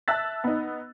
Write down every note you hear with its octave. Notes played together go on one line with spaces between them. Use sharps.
E5 A5 E6 F#6 A6
B3 D#4